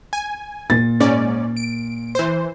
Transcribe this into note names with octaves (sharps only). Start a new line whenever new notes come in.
G#5
A#2 A6
G#2 C#4 D5
D7
E3 C5